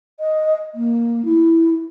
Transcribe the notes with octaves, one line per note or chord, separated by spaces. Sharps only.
D#5
A#3
E4